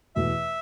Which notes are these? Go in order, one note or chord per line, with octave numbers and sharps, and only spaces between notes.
E2 B2 A3 E5